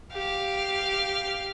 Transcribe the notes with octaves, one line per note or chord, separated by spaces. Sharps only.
G4 F5